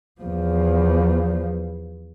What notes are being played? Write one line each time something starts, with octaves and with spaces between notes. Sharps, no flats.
E2 F3